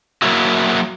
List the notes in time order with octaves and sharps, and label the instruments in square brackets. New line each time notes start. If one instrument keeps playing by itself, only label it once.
[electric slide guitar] F#3 A#3 E4 F#4